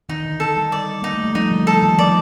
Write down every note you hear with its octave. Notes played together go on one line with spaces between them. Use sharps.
D#3 D#4
D3
D#3 A4
G3
D5
A#3 D#4
A3
G3
F3 D#4
D3
A4
F3
D#3
F3 D5